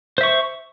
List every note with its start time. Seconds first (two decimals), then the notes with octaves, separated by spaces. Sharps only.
0.18 C5
0.21 E5
0.23 C#6